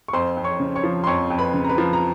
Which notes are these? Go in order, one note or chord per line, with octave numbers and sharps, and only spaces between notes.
C#6
F2 C5 C6
F2
C#5 C#6
C#3
C#5 C#6
F3
C6
F2 C#5 C#6
F2
B4 B5
C#3
A#5
B4 B5
F3
A#5